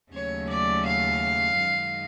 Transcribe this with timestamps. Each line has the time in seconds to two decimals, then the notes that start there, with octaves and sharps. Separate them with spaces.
0.13 D#2 C#3 F#3 A3 C#4 C#5
0.50 D5
0.86 F5
1.59 F#2 D#3 G#3